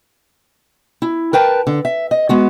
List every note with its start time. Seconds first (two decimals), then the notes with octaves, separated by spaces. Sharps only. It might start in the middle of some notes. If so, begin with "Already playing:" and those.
1.02 E4
1.33 A#4 B4 G5 A5
1.67 D3
1.85 E5
2.11 D#5
2.29 G#3 B3 F#4